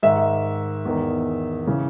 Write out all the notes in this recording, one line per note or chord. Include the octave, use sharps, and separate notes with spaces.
G#2 D#3 E5
E2 D#3
C#3 E3